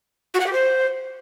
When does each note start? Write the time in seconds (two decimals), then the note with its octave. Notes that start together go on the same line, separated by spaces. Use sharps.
0.34 F#4
0.40 F#5
0.46 G4
0.53 C5